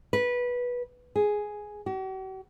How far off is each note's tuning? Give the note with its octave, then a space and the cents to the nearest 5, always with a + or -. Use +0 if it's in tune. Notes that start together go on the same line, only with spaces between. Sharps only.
B4 -15
G#4 +5
F#4 +45